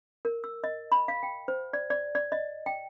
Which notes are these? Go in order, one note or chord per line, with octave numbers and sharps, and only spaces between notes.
A#4
E6
D#5
B5
F5
G5
C5
D5
D5
D5
D#5
G5